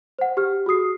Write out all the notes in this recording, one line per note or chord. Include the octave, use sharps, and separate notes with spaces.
C5 F#5
G4 F6
F#4 G#4 D#6 C7